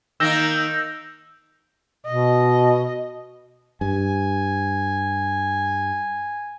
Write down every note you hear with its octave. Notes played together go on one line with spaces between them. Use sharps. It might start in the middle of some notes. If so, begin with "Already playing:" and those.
D#3 A#3 E6 G6 A#6
B2 D#5
G2 G#5